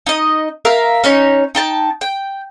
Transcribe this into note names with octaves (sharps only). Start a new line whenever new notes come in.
D#4 D#5
A#4 E5 F5
C#4 D#4 C#5
D#4 G5 A5
G5